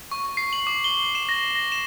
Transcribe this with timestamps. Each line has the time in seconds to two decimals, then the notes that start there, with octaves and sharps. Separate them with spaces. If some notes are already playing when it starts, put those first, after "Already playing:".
0.11 C#6
0.37 C7
0.53 F#7
0.67 D6
0.84 G7
1.15 E7
1.29 A#6
1.55 A#6
1.72 E7